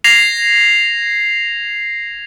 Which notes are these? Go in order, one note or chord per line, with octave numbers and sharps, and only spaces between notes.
G#6 A#6 C7 F7